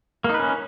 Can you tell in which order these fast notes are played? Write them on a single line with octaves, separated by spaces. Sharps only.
A#3 D#4 B4 C#4